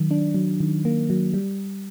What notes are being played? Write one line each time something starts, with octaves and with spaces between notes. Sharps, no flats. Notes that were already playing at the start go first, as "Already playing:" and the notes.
Already playing: D#3 F#3
D4
F#3
D#3
A#3
F#3
G3